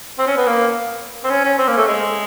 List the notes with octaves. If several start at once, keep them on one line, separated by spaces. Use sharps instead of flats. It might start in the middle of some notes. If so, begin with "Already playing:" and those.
C4
C#4
B3
A#3
C4
C#4
C#4
C4
A#3
A3
G#3